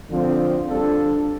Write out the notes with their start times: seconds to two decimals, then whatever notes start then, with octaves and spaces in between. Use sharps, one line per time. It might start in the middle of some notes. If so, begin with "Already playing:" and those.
0.10 D3 F3 C4 F4
0.69 G3 D4 F4 A4